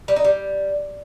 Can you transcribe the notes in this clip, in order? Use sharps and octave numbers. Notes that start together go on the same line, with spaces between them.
G3
D#4
G3